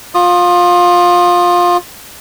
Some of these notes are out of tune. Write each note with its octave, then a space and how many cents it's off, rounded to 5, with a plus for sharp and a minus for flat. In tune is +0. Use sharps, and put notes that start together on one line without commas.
F4 +20 D#6 -20